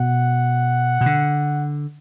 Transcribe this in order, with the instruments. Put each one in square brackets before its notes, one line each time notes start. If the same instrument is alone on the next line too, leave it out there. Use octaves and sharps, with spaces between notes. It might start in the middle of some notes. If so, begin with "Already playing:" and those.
Already playing: [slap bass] B2 [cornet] F#5
[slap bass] B2
D3